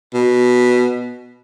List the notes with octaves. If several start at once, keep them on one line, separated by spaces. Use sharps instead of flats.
B2